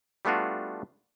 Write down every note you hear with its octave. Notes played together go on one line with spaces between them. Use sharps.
G3 A3 B3 D4 F4 F#4